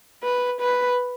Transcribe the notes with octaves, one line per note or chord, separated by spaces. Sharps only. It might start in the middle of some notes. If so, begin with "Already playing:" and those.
B4
B4